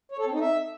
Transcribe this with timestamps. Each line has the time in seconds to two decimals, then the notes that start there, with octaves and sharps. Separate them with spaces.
0.12 C#5
0.19 A4
0.26 C4
0.33 D#4
0.40 E5